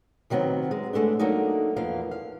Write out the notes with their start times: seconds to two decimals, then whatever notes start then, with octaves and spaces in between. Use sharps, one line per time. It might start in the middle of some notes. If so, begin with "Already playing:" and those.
0.30 C3 D#3 F#3 B3 C4
0.71 G#3
0.93 D3 G#3 A3 B3 D4
1.19 F#3 A3 A#3 D4 D#4
1.76 E2 F3 A#3 B3 F5
2.11 F5